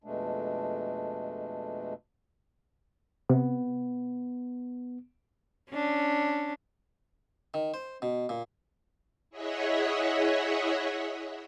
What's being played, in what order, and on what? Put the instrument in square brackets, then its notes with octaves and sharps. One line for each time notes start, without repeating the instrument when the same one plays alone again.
[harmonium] F2 B2 G#3 A3 D4
[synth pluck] C3 [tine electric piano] B3
[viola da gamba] C#4 D4
[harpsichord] D#3
C5
B2
A#2
[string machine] E4 G#4 C#5 D#5 E5 F#5